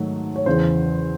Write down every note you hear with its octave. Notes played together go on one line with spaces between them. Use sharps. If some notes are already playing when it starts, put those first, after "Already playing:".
Already playing: G#2 D#3 F#3 A3
C#5
E2 C#3 E3 C5